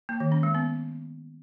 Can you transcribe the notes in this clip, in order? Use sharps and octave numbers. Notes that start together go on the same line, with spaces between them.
A#3
D#3
C#4
G#3
B3